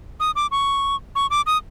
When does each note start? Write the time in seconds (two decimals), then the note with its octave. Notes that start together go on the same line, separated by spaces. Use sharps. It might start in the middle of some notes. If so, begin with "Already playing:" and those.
0.20 D#6
0.36 D6
0.51 C#6
1.15 C#6
1.30 D6
1.46 D#6